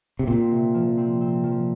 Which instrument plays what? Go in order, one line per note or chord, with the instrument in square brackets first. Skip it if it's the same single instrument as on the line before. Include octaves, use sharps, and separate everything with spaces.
[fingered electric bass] C3
[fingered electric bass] A#2 [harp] C4
[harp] C3
F3
C4
C4
F3